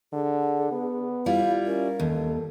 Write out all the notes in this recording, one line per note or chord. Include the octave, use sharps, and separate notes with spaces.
D3 G#4
B3
G3 E4 F4 F5
C#4 A#4
D#2 A4